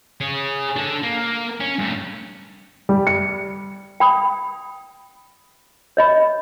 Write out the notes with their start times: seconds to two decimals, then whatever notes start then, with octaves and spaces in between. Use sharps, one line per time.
0.21 G#4 C#5
0.76 D4 A4
1.03 A#3
1.60 C#4
1.79 G2 A3
2.89 G3
3.07 C#7
4.00 G5 B5 D#6
5.97 C#5 D#5 B5